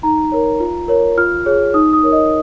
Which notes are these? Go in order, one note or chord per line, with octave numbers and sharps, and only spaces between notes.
D#4 A#5
A#4 C#5
F4
A#4 C#5
F4 F6
G#4 C#5
D#4 D#6
D#6
A#4 C#5
D#5